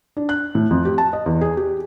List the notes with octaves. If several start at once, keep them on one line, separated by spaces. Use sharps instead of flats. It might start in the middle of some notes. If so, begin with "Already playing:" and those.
D4
F#6
A2
F2
G4
A5
D#5
E2
G#4
G4